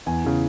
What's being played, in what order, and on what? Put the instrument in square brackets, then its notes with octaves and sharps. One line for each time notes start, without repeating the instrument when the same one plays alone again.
[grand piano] E2 G#5
C#3 E3